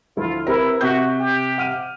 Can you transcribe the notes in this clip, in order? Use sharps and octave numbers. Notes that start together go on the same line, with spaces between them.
D2 F3 E4 F4
C4 E4 G4 A#4 B4
C3 F#4 D#6 G6 B6
G4
F#5 F6 D#7